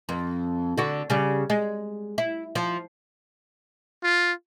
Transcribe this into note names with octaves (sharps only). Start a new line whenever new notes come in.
F2
D3 F#4
C#3 G3
G#3
E4
F3
F4